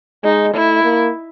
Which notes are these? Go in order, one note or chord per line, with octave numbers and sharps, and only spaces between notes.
G#3 D#4
A3 E4
A#3